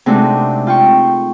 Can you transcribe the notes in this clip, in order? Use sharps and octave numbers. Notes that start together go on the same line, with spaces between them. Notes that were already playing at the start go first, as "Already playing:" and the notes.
C3 G#3 A3 D4 D#4 F#4
F4 G5 C#6